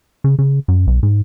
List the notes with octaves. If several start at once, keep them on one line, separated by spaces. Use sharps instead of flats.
C#3
C#3
F#2
B1
G#2